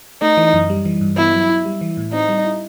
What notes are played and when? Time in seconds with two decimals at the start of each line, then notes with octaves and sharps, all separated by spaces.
0.22 A3 D#4
0.37 E3
0.53 F#2
0.70 G3
0.85 E3
1.01 G2
1.17 B3 E4
1.34 F#3
1.50 E4
1.65 G3
1.81 E3
1.97 A2
2.13 C4 D#4
2.29 G3
2.45 E4